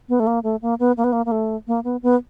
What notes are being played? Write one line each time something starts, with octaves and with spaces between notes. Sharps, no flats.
B3
A3
A#3
A3
A#3
B3
A#3
B3
A#3
A#3
A3
A#3
B3
B3